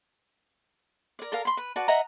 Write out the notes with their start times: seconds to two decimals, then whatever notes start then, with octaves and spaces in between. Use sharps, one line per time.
1.19 A#4 D5
1.32 A4 A#4 F5
1.45 B5 C6
1.57 B4
1.76 F#4 B4 D5 A5
1.88 D#5 E5 F#5 A#5